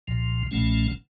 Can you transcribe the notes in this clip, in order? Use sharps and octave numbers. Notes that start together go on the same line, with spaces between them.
C2 A#2 F3
B1 A#2 F3 A3 C#4